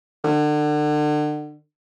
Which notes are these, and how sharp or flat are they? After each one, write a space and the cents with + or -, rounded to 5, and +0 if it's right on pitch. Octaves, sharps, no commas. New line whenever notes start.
D3 +35